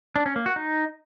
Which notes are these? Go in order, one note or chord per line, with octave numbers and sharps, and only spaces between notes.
D4
C#4
A#3
F#4
D#4